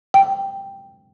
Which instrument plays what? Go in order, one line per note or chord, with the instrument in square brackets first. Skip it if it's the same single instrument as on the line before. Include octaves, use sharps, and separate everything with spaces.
[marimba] G5